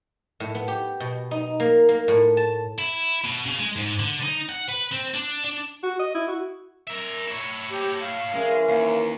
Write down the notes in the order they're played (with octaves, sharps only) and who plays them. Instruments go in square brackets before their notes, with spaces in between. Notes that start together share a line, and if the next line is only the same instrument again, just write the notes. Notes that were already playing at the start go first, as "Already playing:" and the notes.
[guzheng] A2
B3
G4
B2
D#4
A#3
A#3
A2
A5
[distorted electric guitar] E4
B2
C#3
G#3
G#2
D3
D#4
F#5
B4
C4
D4
D4
[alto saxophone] F#4
D#5
E4
F#4
[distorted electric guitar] A#4 E5
E4 C#5
[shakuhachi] G4
F5
[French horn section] E3 C#4 A#4 [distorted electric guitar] G#3
[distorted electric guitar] D#2